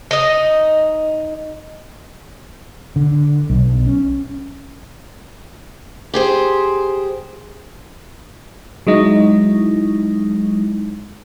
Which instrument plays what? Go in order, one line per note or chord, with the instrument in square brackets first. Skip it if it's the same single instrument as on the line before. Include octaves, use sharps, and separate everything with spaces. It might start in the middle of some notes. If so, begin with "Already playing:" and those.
[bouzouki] D#4 D#5
[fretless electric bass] D3
B1
C#4
[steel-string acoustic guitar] G4 G#4 C5
[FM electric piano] F#3 G#3 D#4 E4